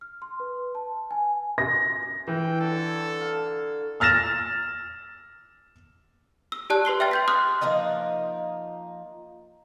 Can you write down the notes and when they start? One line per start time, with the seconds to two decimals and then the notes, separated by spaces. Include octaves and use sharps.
0.01 F6
0.22 C6
0.40 B4
0.75 A5
1.11 G#5
1.58 A#6
2.28 E3 G5
2.61 D3 A4 C#5
3.20 F5 A#5
4.00 E6 F6 A6 A#6 E7
6.52 E6
6.70 G4 D5 A5 F#6
6.85 B4 C6 C7 G7
7.00 E5 G5 F6 A6
7.11 C6 G6 B6
7.28 C6 D#6 F6 F#6
7.61 F3 A#3 D#4 D#5